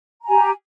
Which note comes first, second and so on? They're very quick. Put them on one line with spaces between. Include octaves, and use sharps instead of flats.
A#5 G#5 G4